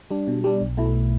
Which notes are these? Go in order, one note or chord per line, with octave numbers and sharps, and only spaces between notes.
G3 D4
B2
G3 D4
B1
B2 A3 E4